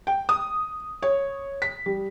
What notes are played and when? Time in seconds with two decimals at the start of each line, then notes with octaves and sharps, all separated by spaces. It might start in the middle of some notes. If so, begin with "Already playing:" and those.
0.07 G5
0.29 D#6
1.02 C#5
1.62 B6
1.86 G3